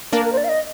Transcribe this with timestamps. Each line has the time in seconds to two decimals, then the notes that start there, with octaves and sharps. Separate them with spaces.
0.12 A#3 D4 A#4
0.25 A#4
0.33 C5
0.37 D5
0.44 F5
0.49 D#5